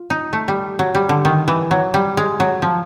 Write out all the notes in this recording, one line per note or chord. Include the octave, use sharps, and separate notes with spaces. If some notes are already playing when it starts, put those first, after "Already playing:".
Already playing: F4
D#4
A3
G3
F#3
G3
D3
D#3
E3
F#3
G3
G#3
F#3
F3